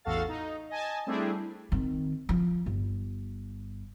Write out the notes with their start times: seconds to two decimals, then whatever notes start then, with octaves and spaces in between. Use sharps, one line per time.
0.05 A1 E2 F#4 A4 F5 A6
0.28 D#4
0.69 D#5 G#5 A5
1.07 G3 A3 C4 D4 E4 G#4
1.72 D#3 C4
2.29 F3
2.66 G1